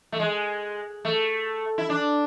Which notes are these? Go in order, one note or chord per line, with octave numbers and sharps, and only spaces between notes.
A3
G#3
A3
E4
D4